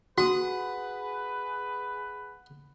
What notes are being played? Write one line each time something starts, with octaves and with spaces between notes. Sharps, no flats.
F#4 G#4 B4 F#5 D#6